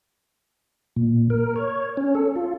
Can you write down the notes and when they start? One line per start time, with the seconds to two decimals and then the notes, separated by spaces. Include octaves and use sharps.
0.96 A#2
1.30 A#4
1.56 C#5
1.97 C#4
2.15 A4
2.36 F4